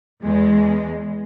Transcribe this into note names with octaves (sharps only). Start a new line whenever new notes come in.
E2 G#3